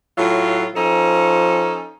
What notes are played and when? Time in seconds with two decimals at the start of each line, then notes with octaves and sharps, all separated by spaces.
0.18 A2 F#3 F4
0.75 F3 C#4 D#4 A4